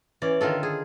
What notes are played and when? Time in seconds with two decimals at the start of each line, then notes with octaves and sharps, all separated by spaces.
0.22 E3 C#4 D5
0.41 D3 D#3 F4 A4
0.63 G#4